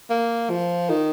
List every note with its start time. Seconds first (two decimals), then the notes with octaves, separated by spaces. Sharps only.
0.10 A#3
0.50 F3
0.90 D#3